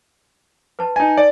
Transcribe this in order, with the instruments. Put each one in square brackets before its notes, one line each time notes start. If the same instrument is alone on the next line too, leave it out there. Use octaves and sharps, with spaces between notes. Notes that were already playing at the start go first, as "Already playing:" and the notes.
[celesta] B4 A5
[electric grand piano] D#4 G#5
D5